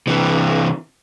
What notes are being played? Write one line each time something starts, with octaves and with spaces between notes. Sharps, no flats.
C3 E3